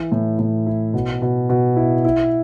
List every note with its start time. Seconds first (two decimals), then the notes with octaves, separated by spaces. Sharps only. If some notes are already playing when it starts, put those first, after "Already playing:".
Already playing: E3
0.12 A2
0.39 A2
0.66 E4
0.94 B2
1.22 B2
1.49 B2
1.76 E4
2.04 E4